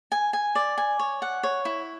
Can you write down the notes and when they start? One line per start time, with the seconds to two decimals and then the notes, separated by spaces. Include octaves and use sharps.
0.12 G#5
0.33 G#5
0.55 D5
0.78 G#5
0.99 C#5
1.22 F#5
1.43 C#5
1.65 E4